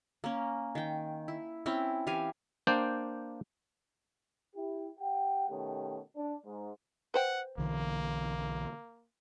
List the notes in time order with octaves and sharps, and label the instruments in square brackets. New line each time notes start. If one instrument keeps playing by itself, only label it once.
[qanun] A#3 C#4
D#3 G5
E4
C4 C#4 E4 G5
E3 G4 F5 G#5
[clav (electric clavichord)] A#3 D4 C5 D5 G5
[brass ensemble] E4 G4
G4 F#5 G5
B2 D#3 A3 C#4 G4
D4
G#2
[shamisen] B4 C5 G5 [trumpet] F#5
[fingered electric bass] B1 D3 E3 [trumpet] A#3